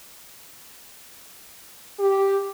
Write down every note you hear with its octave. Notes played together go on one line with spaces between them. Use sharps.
G4